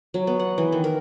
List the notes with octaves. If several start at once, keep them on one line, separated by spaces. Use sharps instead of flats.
F#3
B3
F#5
E3
D#3
A#4